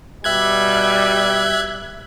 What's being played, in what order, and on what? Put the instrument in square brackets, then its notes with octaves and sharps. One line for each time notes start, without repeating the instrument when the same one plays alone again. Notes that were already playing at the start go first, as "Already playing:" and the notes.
[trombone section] B2 G3 [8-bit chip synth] E5 F#6 G#6